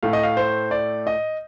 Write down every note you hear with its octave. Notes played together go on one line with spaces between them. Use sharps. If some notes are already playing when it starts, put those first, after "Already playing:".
A2 A3 F5
D#5
F5
C5
D5
D#5